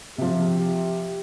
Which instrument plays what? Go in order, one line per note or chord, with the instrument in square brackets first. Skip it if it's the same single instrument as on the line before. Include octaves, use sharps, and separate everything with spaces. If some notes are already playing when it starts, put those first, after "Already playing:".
[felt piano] C3 F3 [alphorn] G4